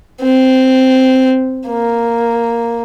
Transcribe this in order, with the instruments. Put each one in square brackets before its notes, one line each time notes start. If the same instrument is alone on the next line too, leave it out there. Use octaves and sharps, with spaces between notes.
[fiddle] C4
A#3